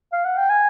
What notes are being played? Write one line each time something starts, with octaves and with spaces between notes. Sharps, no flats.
F5
F#5
G5
G#5